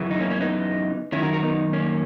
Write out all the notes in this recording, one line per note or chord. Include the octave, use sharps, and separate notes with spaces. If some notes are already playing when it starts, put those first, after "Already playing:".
Already playing: F#2 C#3 E3
D#4
A#3 C#4
A#3 C#4
B3 D#4
F#2 D#3 C#4 E4
F#4 A#4
F#4 A#4
B3 D#4
A#3 C#4